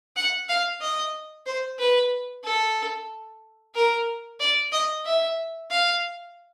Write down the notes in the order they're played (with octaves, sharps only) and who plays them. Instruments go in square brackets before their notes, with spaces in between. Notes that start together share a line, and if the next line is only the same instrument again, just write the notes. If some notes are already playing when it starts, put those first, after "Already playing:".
[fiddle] F#5
F5
D#5
C5
B4
A4
A#4
D5
D#5
E5
F5